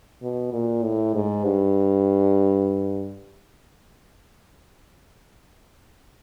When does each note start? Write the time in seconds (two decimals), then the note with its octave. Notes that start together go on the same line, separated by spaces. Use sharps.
0.22 B2
0.52 A#2
0.83 A2
1.14 G#2
1.45 G2